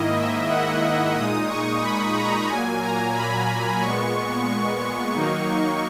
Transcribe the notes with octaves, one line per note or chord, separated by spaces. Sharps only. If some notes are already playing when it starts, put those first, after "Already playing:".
Already playing: G#2 D#3 A#3 E4 D#5
E5
F#5
A#2 G#3 D#4 D#6
C#6
B5
A#5
A#2 F#3 A#3 G#5
A#5
B5
A#2 G#3 B3 C#6
C#6
D#3 F#3 A#3 D#4